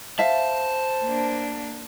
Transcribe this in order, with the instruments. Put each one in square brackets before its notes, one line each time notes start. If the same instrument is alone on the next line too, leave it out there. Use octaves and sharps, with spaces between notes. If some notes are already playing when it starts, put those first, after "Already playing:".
[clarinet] C5 [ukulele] E5 F5 [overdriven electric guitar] A5
[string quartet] A#3 D4